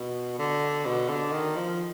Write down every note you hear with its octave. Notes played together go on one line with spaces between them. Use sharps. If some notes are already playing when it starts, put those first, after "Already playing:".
Already playing: B2
D3
B2
D3
D#3
F3